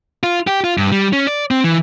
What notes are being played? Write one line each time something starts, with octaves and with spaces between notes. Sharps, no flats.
F4
G4
F4
G2
G3
C#4
D5
C4
E3